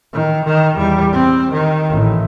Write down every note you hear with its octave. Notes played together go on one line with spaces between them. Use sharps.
D#3
D#3
E2 G3
C4
D#3
A1